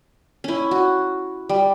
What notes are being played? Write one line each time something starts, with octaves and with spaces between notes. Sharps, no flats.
C#4 E4
F#4
G3